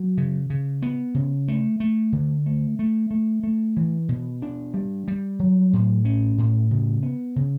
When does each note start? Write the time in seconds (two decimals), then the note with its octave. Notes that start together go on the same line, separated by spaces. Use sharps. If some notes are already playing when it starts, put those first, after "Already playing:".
Already playing: F#3
0.18 C#3
0.50 C#3
0.82 B3
1.15 C#3
1.48 A3
1.80 A3
2.13 D3
2.46 A3
2.79 A3
3.11 A3
3.43 A3
3.77 E3
4.09 B2
4.42 D4
4.74 G3
5.08 G3
5.39 F#3
5.73 A2
6.05 C#4
6.38 A2
6.71 C#3
7.03 B3
7.36 C#3